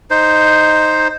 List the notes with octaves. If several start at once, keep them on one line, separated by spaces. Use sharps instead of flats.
D#4 C5